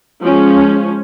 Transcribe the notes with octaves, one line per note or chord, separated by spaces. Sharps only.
F3 G#3 C#4